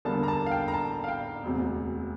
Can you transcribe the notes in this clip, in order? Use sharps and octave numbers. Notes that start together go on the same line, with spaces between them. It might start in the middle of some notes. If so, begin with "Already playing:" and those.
E2 D3 G3 A#3 A5
A#5
A5
F5
G5
A#5
A5
F5
G5
E1 D2 C3